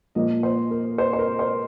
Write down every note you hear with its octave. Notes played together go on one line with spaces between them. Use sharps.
A#2 F3 A#3 D#5
C5
A#4
C5
C5
A#4
C5